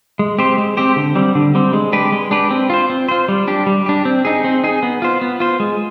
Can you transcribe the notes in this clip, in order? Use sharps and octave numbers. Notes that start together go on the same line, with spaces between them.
G#3
C4 G4 C5
G#3
C4 G4 C5
D3
G3 C4
D3
G3 C4
G#3
D4 G4 B4
G#3
D4 G4 B4
C4
F4 C5
C4
F4 C5
G3
D4 G4
G3
D4 G4
C4
D#4 G#4
C4
D#4 G#4
B3
F4 C5
B3
F4 C5
G#3